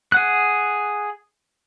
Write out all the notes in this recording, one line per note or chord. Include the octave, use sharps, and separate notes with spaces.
G#4 F#5 F#6